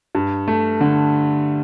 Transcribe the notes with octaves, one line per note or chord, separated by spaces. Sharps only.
G2
A3
D3